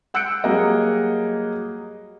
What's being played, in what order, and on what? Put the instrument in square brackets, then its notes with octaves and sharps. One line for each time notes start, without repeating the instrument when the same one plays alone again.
[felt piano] F#5 E6 F#6 G6 C#7 D7
F#3 G3 A#3 G#4 D#5